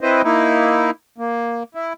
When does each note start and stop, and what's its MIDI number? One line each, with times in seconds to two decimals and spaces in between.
0.01 0.22 60
0.01 0.22 64
0.01 0.22 71
0.01 0.22 72
0.01 0.22 75
0.24 0.91 58
0.24 0.91 63
0.24 0.91 64
1.18 1.63 58
1.75 1.93 64